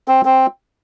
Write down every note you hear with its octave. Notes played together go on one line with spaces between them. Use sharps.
C4
C4